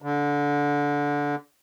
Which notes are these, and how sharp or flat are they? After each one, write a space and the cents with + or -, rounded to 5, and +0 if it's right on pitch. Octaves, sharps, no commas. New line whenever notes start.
D3 -20